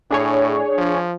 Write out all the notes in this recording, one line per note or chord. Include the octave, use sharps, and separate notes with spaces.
A2 D4 G#4 C#5
F3